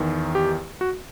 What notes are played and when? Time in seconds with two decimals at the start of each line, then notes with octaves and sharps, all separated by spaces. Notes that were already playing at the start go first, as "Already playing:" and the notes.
Already playing: E2 D#3
0.35 G4
0.81 F#4